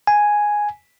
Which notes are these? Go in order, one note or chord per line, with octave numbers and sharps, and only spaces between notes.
G#5